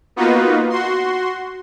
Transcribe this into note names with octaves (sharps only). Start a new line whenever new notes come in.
A#3 B3 D#4 F4 F#4 B4
F#4 C6